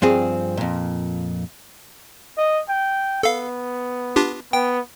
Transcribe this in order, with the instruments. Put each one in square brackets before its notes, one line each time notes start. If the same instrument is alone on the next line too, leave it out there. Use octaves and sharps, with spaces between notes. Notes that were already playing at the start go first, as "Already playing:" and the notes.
[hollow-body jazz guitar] G2 F3 C4 G#4
F2 A#2
[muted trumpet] D#5
G5
[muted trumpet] B3 [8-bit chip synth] A4 F5
[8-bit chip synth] D4 F4 G4
[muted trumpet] B3 [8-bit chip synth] G5